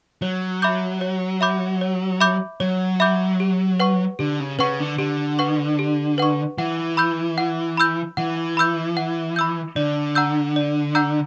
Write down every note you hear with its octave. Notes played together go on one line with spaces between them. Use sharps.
F#3 C#5
E5 B5 D6 G6
C#5
E5 B5 D6 G6
C#5
E5 B5 D6 G6
F#3 C#5
E5 B5 D6 G6
G4
B4 F#5 C#6
D3 G4
C#3
C#3 B4 F#5 C#6
D3
D3 G4
B4 F#5 C#6
G4
B4 F#5 C#6
E3 F#5
B5 E6 G6
F#5
B5 E6 G6
E3 F#5
B5 E6 G6
F#5
B5 E6 G6
D3 D5
F#5 A#5 E6 G6
D5
F#5 A#5 E6 G6